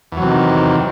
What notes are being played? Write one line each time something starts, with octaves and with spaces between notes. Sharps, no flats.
E2 C3 D#3 F#3